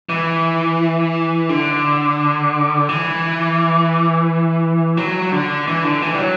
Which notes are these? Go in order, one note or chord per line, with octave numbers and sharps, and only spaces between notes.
E3
D3
E3
F#3
D3
E3
D3
E3
G3
F#3